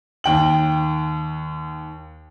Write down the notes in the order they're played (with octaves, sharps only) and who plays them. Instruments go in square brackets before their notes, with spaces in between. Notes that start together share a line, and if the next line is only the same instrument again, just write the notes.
[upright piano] D#2 G5 F#7